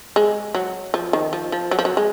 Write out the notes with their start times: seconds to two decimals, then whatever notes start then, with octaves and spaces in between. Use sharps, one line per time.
0.16 G#3
0.55 F#3
0.94 F3
1.13 D#3
1.33 F3
1.52 F3
1.71 F#3
1.79 F3
1.85 F#3
1.97 G#3